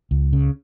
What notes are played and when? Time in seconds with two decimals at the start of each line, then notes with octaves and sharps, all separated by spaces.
0.11 C#2
0.33 C#3